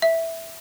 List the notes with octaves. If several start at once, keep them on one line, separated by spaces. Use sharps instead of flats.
E5